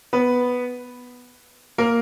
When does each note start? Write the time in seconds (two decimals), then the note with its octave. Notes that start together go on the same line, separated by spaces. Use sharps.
0.13 B3 B4
1.78 A#3 A#4